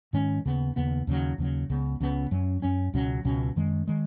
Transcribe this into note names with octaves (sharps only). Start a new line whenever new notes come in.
G#2 D#3 G#3 C#4
D#2 C#3 B3
D#2 C#3 B3
D#2 C#3 F#3
D#2 C#3 F#3
C#2 C#3 B3
C#2 C#3 B3
F#2 F#3 C#4
F#2 F#3 C#4
C#2 B2 F#3 C#4
C#2 B2 F#3 C#4
F#2 D#3 G#3
D#3 G#3